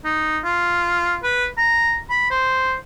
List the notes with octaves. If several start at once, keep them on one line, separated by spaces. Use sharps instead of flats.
D#4
F4
B4
A#5
B5
C5